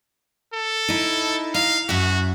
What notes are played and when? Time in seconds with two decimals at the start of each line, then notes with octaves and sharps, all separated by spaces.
0.53 A4
0.89 D#4 E4
1.54 D#4 F5
1.89 F#2 F#4 E5